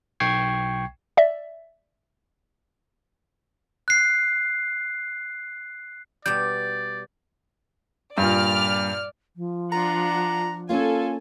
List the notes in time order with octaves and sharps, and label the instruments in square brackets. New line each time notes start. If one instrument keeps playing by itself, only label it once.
[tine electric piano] B1 G5 C#6 G#6 C7
[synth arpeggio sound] D5 E5
[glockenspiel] F#6 C7
[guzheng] B2 G3 [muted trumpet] D5 [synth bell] G6
[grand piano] G2 A#2 [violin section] D5 F6
[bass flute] F3
[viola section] D4 F4 F#5 [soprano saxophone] A#5
[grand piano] A#3 C#4 [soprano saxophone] F4 [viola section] A4 G#5